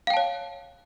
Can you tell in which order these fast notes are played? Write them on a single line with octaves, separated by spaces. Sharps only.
F5 G5 A5 C#5